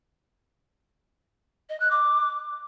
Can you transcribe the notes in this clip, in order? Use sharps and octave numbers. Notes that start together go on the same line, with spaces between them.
D#5
F#6
D6